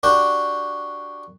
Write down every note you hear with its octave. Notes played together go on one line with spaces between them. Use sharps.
D4 F#4 G4